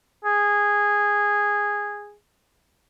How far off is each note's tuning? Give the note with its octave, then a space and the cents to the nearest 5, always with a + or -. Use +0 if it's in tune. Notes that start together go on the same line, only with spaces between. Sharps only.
G#4 -10